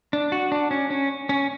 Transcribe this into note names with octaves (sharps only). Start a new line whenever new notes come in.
D4
F#4
D4
C#4
C#4
C#4